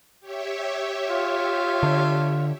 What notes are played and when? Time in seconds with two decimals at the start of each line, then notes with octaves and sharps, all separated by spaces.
0.20 G4 C#5 E5
1.10 F4
1.83 D3